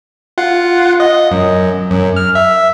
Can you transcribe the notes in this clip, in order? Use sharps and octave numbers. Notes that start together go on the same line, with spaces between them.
F4 F#5
D#5
F#2
F#2
F6
E5